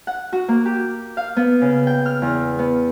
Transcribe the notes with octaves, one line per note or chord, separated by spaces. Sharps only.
F#5
F#4
A#3
G4
F5
B3
C#3
G5
F6
E2
B3